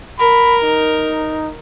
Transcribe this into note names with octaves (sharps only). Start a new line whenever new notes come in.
A#4 B5
D#4